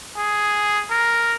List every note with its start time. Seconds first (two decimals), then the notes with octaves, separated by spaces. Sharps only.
0.17 G#4
0.90 A#4